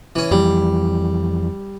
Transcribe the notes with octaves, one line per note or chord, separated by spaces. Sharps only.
E3 C#4
F2 E3 G3